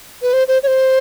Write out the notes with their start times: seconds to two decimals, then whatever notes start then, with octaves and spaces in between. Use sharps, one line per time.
0.22 B4
0.33 C5
0.48 C5
0.63 C#5
0.67 C5